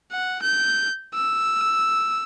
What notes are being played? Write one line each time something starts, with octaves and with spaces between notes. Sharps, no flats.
F#5
G6
E6